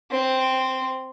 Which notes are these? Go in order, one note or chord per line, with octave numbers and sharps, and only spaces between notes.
C4